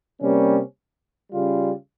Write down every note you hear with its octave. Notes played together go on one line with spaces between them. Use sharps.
C3 G3 A#3 C#4
C#3 G3 C#4 F4